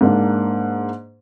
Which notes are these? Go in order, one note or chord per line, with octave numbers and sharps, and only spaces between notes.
G#2 A#3 D4